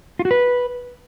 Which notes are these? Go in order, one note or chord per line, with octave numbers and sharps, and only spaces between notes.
F4
F#4
B4